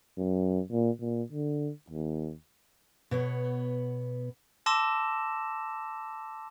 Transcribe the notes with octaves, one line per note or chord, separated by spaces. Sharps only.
F#2
A#2
A#2
D3
D#2
B2 B3 C#5
A5 C6 D6 E6 A#6 E7